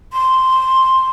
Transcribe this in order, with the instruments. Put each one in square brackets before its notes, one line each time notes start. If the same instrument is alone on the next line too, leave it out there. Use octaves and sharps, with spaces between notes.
[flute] C6